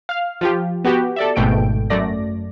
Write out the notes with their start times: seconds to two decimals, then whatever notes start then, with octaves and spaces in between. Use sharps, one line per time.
0.09 F5 F6
0.41 F3 F4 G4
0.84 B3 F#4 G4
1.16 A4 D5 E5
1.36 G#1 G#2 B2 A3 G5 D7
1.90 F#2 A3 D5 A#6